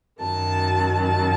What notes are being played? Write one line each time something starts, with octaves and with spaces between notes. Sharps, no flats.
F#2 D#3 F#3 A5
A5